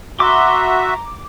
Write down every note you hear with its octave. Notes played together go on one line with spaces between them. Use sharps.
F#4 E5 A#5 C6 D6